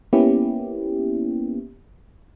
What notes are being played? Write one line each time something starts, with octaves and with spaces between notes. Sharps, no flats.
A#3 B3 C#4 E4 G4